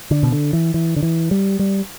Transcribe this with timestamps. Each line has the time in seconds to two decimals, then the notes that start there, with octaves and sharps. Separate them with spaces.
0.11 D3
0.23 B2
0.32 D3
0.53 E3
0.74 E3
0.96 D3
1.03 E3
1.31 G3
1.59 G3